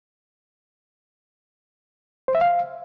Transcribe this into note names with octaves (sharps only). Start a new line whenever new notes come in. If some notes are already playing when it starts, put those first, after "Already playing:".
C5
E5
F5